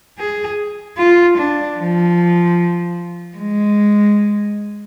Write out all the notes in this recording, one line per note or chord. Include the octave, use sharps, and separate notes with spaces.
G#4
F4
D4
F3
G#3